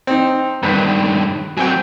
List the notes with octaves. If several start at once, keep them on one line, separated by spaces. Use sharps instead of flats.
C4 D#4
G2 D#3 B3 B4
F#3 C4 G5 G#5